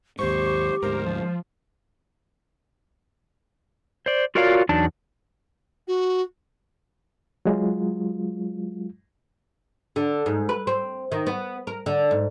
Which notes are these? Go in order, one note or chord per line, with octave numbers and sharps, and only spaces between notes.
D#2 G#2 G4 C5 C#6
D2 G#2 A#4 C5
F3
C5 D5
F4 F#4 A#4 C#5 D5 F5
E2 F#3 D4 D#4 A5
F#4
F#3 G#3 F4
D3
G#2
B4
C4
D#3
B3
A#4
D3
G#2